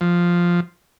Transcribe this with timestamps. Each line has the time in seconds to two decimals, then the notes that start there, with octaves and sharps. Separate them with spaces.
0.01 F3